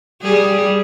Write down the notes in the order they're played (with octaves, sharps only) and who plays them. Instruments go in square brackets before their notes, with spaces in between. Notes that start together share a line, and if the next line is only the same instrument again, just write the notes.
[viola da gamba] G3 G#4